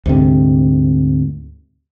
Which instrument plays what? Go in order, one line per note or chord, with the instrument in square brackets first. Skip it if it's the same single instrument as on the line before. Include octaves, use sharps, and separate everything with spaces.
[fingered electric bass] D2 G#2 C3